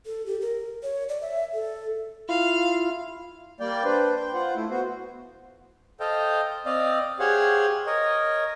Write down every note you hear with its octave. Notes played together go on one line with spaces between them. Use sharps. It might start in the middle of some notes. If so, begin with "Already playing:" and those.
A4
G4
A#4
C#5
D5
E5
A4
E4 F4 F5
G3 A#3 D5 G5
D4 B4 C5
G5
F4 C5 F#5
A3 E4
B3 F#4 C5
A4 C5 D#5 F5 G5
C4 D5 D#5 F5
G4 G#4 C5 C#5 F5 F#5
A#4 C#5 D#5